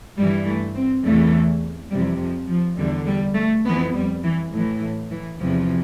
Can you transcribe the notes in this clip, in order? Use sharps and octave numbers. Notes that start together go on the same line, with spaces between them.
G2 E3 G3
A3
C4
E2 C3 E3 A3
F2 C3 E3 G3
F3
F3
E2 D3 G3
G3
A3
F2 E3 B3
G3
E3
A2 E3
E3
E2 C3 E3 F3